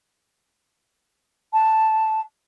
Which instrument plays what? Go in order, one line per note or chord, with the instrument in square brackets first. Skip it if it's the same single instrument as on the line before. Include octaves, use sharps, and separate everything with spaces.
[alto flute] A5